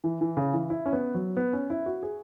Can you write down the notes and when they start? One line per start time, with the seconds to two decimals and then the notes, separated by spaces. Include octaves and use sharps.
0.04 E3
0.21 E3
0.37 C#3
0.53 E3
0.70 E4
0.86 C#4
0.93 B3
1.14 F#3
1.37 B3
1.53 C#4
1.70 E4
1.86 F#4
2.03 G#4